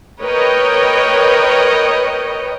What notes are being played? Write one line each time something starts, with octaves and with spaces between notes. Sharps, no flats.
A#4 B4 C#5 D#5 G5